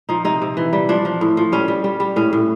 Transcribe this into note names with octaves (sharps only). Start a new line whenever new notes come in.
F3 D#4
C3 D#4
C3
E3
G3
F3 D4
F3
A2
F3
G3 C#4
G3
G3
G3
A2 C#4
A2